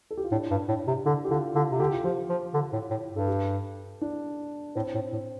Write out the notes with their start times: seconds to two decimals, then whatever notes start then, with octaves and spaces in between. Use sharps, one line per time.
0.11 A4
0.17 G4
0.24 F4
0.31 A2 D4
0.50 G2
0.68 A2
0.87 C3
1.05 D3 D4
1.25 G4
1.30 D3 F4
1.55 D3 F4
1.71 C3
1.80 D3 G4
1.92 F4
2.04 F3 G4
2.29 F3
2.54 D3
2.73 A2
2.90 A2
3.10 G2
3.16 A4
3.28 G4
4.01 D4
4.75 A2 C4
4.94 A2
5.12 A2